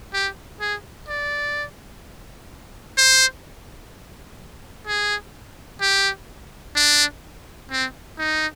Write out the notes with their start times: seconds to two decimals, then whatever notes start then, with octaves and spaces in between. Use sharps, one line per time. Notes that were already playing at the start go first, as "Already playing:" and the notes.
0.13 G4
0.60 G#4
1.08 D5
2.97 C5
4.87 G#4
5.81 G4
6.76 D4
7.71 C4
8.18 D#4